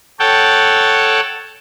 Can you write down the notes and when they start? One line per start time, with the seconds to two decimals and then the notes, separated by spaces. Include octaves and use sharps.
0.20 A4 C#5 F#5 G5 A5